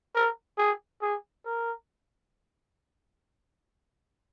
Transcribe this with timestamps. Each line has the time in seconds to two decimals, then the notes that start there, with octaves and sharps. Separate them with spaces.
0.15 A#4
0.58 G#4
1.02 G#4
1.45 A#4